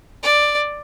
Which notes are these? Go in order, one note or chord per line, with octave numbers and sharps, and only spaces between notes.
D5